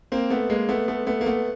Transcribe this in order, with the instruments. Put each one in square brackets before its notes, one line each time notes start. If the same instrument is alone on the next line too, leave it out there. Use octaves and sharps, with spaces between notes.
[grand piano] A#3 C4
A3 B3
G#3 A#3
A3 B3
A3 B3
A3 B3
A#3
A3 B3